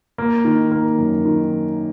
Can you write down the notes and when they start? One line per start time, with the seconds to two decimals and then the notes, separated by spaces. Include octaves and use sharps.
0.18 A#3
0.45 D#3
0.72 A#3
0.98 F#2
1.25 D#3